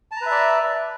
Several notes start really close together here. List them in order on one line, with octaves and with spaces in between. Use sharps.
A5 A#5 B4 E5 D5